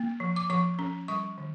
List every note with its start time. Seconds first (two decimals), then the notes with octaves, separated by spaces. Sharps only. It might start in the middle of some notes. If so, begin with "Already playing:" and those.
Already playing: A#3
0.20 F3
0.36 D6
0.50 F3 C#6
0.79 C#4
1.08 G3 C#6
1.38 D#3